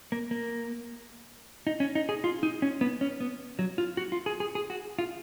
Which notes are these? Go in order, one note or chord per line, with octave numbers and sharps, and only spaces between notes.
A#3
A#3
D#4
C#4
D#4
G#4
F4
D#4
C#4
B3
C#4
B3
F#3
F4
F#4
F4
G#4
G#4
G#4
F#4
F4